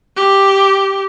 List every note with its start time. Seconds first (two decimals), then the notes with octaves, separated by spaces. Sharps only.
0.16 G4